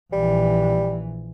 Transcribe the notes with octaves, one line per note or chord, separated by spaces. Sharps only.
A#1 E3 G3